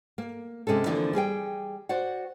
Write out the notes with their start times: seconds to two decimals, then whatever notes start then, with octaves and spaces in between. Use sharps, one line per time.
0.18 A#3
0.67 C3 G#3 C#4 A4
0.86 D3 E3 F3 A#3 C4 D4
1.13 G3 G#4 B4 G5
1.89 F#4 C5 D5 F#5